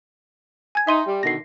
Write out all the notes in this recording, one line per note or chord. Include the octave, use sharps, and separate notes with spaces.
G#5 G#6
D#4 E5 C6 D#7
G3
B2 D3 D#3 A#6 C7